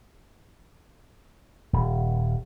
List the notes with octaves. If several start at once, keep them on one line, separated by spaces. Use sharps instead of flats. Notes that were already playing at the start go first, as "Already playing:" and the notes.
D#1